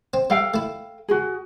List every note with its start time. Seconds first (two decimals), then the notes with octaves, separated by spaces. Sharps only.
0.14 C4
0.30 G3 A4 F5 G5
0.54 A3 E4
1.08 F#4 G#4